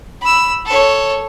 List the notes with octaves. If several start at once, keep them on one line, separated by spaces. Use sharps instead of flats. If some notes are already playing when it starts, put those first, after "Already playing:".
B5 E6
A4 C#5